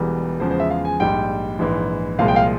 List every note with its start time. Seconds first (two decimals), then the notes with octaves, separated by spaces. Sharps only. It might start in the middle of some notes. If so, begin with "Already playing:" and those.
Already playing: E1 E2 E3 G3
0.40 E2 C#3 F3 G#3 C5
0.51 C5
0.60 E5
0.70 F5
0.85 G#5
1.00 A#1 G#2 G3 G5
1.59 A#1 G#2 E3
2.19 C2 A#2 F3 G#3 F5
2.28 G5
2.36 F5